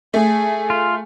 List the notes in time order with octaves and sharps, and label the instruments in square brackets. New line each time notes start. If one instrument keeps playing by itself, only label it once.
[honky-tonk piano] A3 [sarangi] G#4
[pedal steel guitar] F4